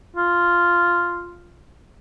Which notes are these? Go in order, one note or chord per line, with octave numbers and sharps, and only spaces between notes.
F4